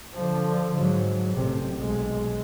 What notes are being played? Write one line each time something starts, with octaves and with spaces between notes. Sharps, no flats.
D3 F3
G#2 F#3
A1 C3
B1 G#3